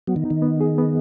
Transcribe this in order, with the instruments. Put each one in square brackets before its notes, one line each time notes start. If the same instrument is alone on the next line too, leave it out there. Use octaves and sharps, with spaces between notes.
[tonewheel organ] F#3 [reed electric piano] B3
[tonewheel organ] D#3
[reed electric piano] D#4
[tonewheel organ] D#3
[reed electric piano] B3
G#4
B3